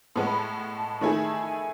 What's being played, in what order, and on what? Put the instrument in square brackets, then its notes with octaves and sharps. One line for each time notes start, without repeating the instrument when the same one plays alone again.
[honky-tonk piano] A2 G#3 B3 [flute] A5
[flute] B5
A5
[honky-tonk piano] D#3 A3 E4 G#4 [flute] A5
[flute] G#5